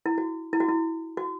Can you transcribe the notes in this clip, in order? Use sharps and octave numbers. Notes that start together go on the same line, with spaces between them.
E4
F#4
E4
F#4
E4
F#4